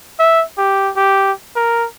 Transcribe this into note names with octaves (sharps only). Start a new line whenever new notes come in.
E5
G4
G4
A#4